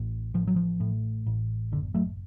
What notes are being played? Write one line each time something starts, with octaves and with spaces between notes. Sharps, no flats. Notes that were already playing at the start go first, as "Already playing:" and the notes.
Already playing: A1
A1 F3
F#3
F3
A2
A1
F#1 D3
F#3 A3